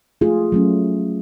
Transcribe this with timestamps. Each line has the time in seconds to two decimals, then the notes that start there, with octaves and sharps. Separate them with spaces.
0.21 A3 F4 G#4
0.52 F#3 A3 C#4